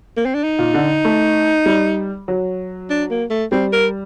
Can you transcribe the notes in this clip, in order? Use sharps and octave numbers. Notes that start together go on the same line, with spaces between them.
A#3
C4
D4
D#4
A#2
D3
A3
G3
F#3
D4
A#3
A3
G3 C4
A#4